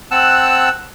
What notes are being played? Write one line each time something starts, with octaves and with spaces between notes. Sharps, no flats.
C4 F#5 A5 E6 F#6